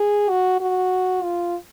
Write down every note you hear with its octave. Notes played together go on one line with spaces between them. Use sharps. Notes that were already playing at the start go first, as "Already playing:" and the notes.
Already playing: G#4
F#4
F#4
F4